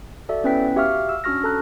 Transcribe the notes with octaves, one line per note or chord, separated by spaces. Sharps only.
F#4 A4 D5 E5
B3 C#4 E4 B4 G5 B6
F#4 G4 E5 F5 C#6 F6
E6
C#4 D4 F#4 C#6 F6 A#6
A4 A5 A#5 F#6